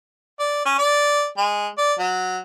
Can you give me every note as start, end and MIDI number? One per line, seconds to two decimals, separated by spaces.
0.40 0.63 74
0.65 0.77 61
0.79 1.27 74
1.38 1.67 56
1.78 1.94 74
2.00 2.38 54